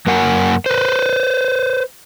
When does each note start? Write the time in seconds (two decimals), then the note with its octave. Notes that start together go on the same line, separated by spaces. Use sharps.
0.07 F#2 A#3 A#4 F#5 G#5
0.66 B4 C5